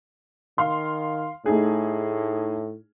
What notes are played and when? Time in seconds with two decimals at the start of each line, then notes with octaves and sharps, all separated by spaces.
0.58 D#3 F5 C6
1.46 A2 A3 D#4 G#4